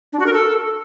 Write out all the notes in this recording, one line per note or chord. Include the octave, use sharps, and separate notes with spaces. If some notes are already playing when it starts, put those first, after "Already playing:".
D4
F#4
A#4
A4